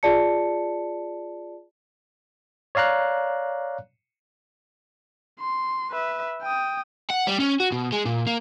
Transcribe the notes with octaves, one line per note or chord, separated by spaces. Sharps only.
F4 G#4 D5 A5 C#7
C#5 D5 F5 A#5 F#6
C6
B4 E5
G5 D#6
F#5
G3
C#4
F#4
B2
G#3
A#2
A#3